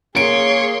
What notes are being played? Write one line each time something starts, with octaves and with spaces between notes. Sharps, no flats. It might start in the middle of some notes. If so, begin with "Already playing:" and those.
A#3 G#4 C#5 C6 D7